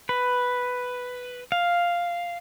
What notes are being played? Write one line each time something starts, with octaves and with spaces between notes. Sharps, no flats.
B4
F5